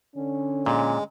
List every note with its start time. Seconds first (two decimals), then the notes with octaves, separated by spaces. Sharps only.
0.16 D3 C#4
0.66 A#2 G#3